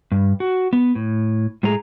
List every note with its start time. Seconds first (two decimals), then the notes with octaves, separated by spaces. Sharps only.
0.12 G2
0.40 F#4
0.73 B3
0.95 A2
1.63 A2 G#3 A3 G#4 A#5